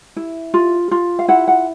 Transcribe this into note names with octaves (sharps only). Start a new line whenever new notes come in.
E4
F4
F4
F5
E4 F#5
F#5